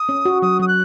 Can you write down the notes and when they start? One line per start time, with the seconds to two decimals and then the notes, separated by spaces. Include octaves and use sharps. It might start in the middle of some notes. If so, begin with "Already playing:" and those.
Already playing: D#6
0.09 C#4
0.25 F#4
0.42 F#3 D#6
0.59 F#3 D#6
0.68 F#6